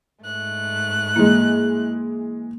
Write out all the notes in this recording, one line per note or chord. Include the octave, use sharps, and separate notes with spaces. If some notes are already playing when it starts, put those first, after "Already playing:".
G#2 A3 F#6
E3 G#3 A#3